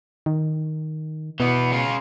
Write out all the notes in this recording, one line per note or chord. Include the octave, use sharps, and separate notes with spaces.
D#3
B2 E3 B3
C#3 F4